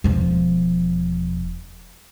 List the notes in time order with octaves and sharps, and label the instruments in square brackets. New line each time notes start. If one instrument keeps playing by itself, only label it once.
[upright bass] E1 F3